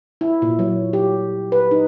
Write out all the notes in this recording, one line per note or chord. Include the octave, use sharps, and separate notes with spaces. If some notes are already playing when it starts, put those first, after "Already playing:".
E4
A#2
F#3
G4
B4
D#4